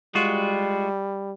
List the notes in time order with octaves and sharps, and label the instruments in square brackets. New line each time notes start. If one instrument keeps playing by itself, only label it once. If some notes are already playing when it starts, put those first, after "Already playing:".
[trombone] G3 [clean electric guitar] G#3 F4 F#4